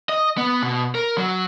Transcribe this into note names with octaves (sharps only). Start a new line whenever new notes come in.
D#5
B3
B2
A#4
F#3